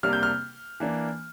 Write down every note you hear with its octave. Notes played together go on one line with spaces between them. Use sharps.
C3 G3 A#3 D4 F6
G6
F6
E3 A#3 D4